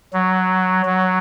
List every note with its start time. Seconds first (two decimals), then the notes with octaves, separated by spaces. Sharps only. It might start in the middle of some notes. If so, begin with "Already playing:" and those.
0.14 F#3
0.86 F#3